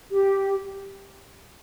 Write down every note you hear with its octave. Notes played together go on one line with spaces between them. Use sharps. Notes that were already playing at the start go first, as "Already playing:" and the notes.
G4